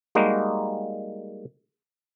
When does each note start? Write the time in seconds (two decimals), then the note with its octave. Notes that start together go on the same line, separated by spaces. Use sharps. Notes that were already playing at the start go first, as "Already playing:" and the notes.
0.15 G3 G#3 A#3 D#4 F#4